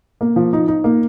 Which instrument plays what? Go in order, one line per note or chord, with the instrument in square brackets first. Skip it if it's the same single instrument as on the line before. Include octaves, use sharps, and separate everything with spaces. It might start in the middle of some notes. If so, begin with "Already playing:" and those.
[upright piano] A#3
F3
D#4
D#4
A#3